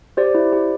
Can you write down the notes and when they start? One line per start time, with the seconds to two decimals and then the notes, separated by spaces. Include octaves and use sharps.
0.17 G4 C5 D5
0.35 E4
0.52 G4